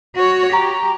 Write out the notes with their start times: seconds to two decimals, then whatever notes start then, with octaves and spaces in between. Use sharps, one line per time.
0.15 F#4 C#5
0.53 G4 A#5